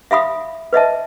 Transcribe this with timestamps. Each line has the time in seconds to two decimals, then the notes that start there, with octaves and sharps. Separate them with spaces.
0.11 E5 F5 B5 D#6
0.73 B4 D#5 E5 A5